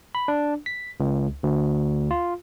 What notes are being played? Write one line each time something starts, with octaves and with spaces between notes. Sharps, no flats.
B5
D4
B6
C#2
D2
F4